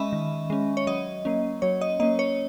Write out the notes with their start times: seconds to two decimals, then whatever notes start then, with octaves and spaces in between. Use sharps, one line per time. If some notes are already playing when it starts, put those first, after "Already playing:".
Already playing: G#3 C#4 D#5 E5 B5 C#6
0.13 D#3
0.50 G#3 C#4
0.77 C#5
0.87 F#3 D#5
1.25 A#3 C#4
1.62 F#3 C#5
1.81 D#5
2.00 A#3 C#4 D#5
2.19 C#5